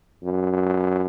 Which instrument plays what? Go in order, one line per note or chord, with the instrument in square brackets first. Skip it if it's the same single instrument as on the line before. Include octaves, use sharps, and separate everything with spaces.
[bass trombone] F#2